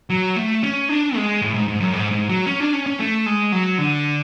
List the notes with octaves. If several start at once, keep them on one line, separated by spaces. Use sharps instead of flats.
F#3
A3
C#4
D4
G#3
A2
G#2
G#2
F#2
G#2
G#2
F#3
C#4
D4
C#4
C#4
A3
G#3
F#3
D3